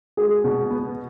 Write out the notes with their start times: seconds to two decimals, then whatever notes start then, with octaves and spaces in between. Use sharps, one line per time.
0.17 G#3 G#4
0.44 B2
0.70 B3